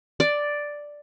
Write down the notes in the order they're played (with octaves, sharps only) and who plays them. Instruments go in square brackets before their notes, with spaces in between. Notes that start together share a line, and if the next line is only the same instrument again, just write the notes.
[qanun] D5